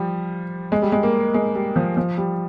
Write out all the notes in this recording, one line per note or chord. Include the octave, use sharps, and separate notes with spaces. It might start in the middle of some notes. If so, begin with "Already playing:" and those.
Already playing: F3 G3
G#3
G3
G#3
A#3
G#3
G3
F3
F3
G3